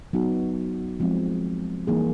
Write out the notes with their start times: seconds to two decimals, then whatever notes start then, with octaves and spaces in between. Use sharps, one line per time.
0.13 F#3 B3 D#4 F#4
1.00 F3 G#3 C4
1.87 E3 G3 A#3 D#4 G#4